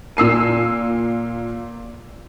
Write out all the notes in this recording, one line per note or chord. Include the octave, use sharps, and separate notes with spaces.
A#2 E6 C7 D#7